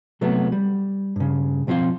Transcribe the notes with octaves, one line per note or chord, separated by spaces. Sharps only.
C3 F#3 A3 B3
G3
G2 C#3
B1 F3 C4 F4 F5